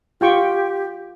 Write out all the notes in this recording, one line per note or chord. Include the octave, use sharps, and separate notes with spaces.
F4 G4 G5 C#6